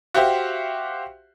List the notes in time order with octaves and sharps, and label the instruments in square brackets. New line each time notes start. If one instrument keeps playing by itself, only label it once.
[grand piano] F#4 G4 C5 E5 F5